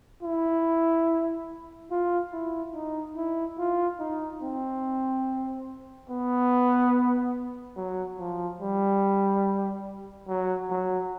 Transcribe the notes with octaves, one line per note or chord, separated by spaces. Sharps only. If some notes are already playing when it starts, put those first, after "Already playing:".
E4
F4
E4
D#4
E4
F4
D#4
C4
B3
F#3
F3
G3
F#3
F#3